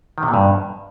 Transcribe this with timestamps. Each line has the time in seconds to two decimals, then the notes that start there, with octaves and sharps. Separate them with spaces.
0.18 D#3
0.23 C3
0.28 A#2
0.34 G2